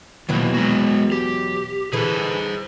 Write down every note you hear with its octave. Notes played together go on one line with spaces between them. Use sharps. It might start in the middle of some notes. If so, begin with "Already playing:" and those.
E2 B2 D#3 F3 F#3 A#3
G#3 F#4
G4
D3 E3 G#4 C5